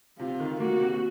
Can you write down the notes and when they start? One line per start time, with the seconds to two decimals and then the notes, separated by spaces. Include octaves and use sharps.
0.19 C3 F4
0.40 D#3
0.60 A#3 F#4
0.80 C3